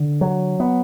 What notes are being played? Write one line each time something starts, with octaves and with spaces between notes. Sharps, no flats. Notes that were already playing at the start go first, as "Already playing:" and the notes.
Already playing: D3
F#3
B3